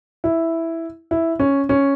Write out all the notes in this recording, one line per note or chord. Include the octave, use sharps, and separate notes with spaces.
E4
E4
C#4
C#4